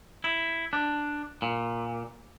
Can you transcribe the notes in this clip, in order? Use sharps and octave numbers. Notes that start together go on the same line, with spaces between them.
E4
D4
A#2